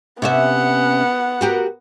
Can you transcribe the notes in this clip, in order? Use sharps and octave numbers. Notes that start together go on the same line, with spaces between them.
C3 B3 C#4 E5 F#5
F#4 G4 A#4